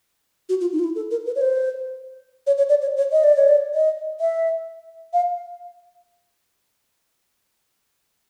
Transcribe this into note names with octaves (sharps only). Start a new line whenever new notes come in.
F#4
F4
D#4
F4
E4
A4
A#4
B4
C#5
C5
C#5
C#5
D5
C#5
C#5
D#5
D5
C#5
D5
D#5
E5
F5